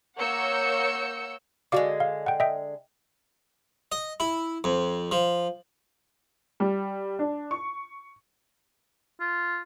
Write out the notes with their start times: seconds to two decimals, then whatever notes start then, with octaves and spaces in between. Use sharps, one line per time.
0.18 A#3 C#5 F#5 E6 G6 C#7
1.72 D3 G3 G#3 F#4 F5 D6
2.00 F5
2.26 F#5 G5
2.40 D#5 E5 G5
3.92 D#5
4.20 E4
4.64 F2
5.11 F3
6.60 G3
7.19 D4
7.51 C#6
9.20 F4